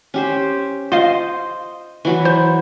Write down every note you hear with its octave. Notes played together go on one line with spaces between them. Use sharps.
C#4 G4 C5
F4 C5 D#5 F5
E3 F#3 E4
C5